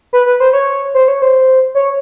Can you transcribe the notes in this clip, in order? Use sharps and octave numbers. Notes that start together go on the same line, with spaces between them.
B4
B4
C5
C#5
C5
C#5
C5
C#5